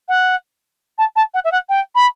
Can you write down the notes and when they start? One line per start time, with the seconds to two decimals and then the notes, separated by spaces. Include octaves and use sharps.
0.08 F#5
0.98 A5
1.16 A5
1.34 F#5
1.44 E5
1.52 F#5
1.69 G5
1.95 B5